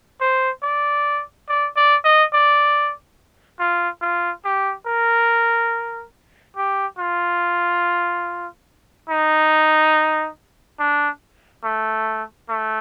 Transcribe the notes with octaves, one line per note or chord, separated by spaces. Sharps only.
C5
D5
D5
D5
D#5
D5
F4
F4
G4
A#4
G4
F4
D#4
D4
A3
A3